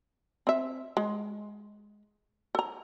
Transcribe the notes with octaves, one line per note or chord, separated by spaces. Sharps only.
C4 E5
G#3
A4 A#5